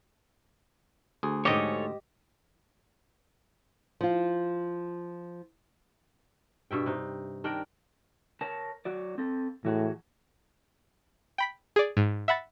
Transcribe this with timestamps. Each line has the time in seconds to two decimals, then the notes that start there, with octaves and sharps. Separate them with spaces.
1.23 D2 G#4
1.45 G#2 G4 A4 C#5 D#5 D6
4.01 F3 F4
6.71 G2 B2 E5 G5
6.86 C3 D#4
7.44 D#3 D4 A#4 G5
8.41 A#4 C#5 A5
8.85 F#3 F#4 D5
9.18 C4 A4
9.65 A2 E3 F#4 G#4
11.38 G5 B5 B6
11.76 G#4 D5
11.97 G#2
12.28 E5 F#5 B5 A6